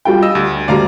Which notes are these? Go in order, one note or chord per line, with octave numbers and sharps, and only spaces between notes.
G3 F4 G5
D#5 E6
D2
D2 G3 D5 F5 A#5